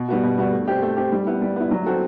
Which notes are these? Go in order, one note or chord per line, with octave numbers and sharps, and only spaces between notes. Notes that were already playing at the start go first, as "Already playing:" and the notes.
Already playing: B2
G3 B3 F#4
B2
G3 B3 F#4
A3
C4 G4
A3
C4 G4
G3
B3 E4
G3
B3 E4
F#3
C4 F#4 A4